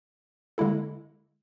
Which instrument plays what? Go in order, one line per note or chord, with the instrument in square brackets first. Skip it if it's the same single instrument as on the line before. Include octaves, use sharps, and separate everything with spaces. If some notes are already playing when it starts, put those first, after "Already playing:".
[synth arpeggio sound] D3 G#3 A#3 E4 A4